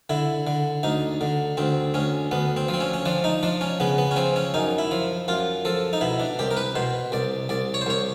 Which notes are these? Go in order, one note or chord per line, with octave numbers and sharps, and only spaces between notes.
D3 E4
D3
D2 D#4
D3
D2 C4
D2 C#4
D2 B3
C4
F3
C4
C#4
C#4
F3 D4
D#4
F3 D4
C#4
C#3 B3
B3
C#4
F3 C4
C#4
F#2 D#4
E4
F3
F#2 F4
F3 A4
D#4
B2 E4
D4
C2 G4
A#4
B4
B2 C5
C2 D5
C2 D5
C#5
C5
C2 C#5